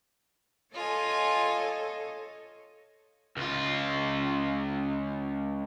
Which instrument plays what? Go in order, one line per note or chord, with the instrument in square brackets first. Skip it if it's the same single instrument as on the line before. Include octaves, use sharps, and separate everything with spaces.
[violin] F4 G#5 [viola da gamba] A4 C#5 D#5
[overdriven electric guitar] C#2 F4